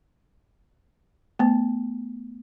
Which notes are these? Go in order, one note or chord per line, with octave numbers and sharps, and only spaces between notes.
A3 B3